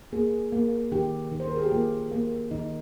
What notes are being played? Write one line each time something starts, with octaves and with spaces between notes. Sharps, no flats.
A#3 G#4
A#3
D#3 G4
D#3
C5
A#4
G#4
G4
A#3 F4
A#3
D#3 D#4